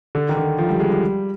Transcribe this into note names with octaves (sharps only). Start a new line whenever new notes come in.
D3
D#3
D3
F3
G3
G#3
G3